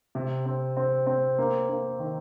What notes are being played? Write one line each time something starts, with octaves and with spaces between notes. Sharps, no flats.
C3
C4
C4
C4
A#3
A#3
D#3